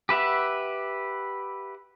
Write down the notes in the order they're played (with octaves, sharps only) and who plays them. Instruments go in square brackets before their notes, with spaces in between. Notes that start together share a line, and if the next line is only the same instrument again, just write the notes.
[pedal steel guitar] G4 B4 E5 F#5